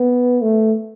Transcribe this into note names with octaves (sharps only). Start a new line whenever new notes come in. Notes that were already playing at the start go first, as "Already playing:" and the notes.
Already playing: B3
A3